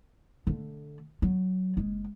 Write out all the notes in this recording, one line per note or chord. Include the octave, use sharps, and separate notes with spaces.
D3 A3
F#3
F#1 G#3